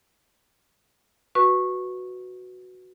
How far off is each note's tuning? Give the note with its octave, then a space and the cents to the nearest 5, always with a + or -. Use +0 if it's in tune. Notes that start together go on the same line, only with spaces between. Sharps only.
F#4 +0 B4 +0 C#6 -15